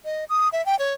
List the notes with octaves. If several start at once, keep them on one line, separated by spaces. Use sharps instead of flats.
D#5
D#6
E5
G5
C#5